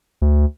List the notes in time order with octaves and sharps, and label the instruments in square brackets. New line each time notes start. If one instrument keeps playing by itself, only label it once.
[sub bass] D2